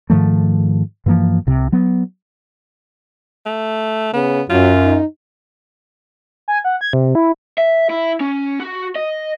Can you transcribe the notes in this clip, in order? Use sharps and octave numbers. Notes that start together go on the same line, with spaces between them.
G#2 D#3 F3 A3
G2 E3 F3 A#3
C2 C3
F#3 B3
A3
C#3 B3
F#2 F#3 F4
D#4
G#5
F#5
G#6
C3
E4
E5
E4
C#4
F#4
D#5